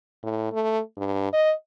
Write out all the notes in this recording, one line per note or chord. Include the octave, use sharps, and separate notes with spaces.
A2
A3
G2
D#5